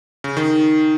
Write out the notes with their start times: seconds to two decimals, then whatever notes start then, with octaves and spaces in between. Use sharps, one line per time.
0.24 C#3
0.37 D#3 D#4